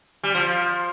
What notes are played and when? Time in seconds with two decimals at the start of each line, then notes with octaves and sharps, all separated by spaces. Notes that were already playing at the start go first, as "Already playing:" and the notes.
0.23 G3
0.34 F3